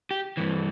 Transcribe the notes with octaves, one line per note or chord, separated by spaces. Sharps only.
G4
G2 E3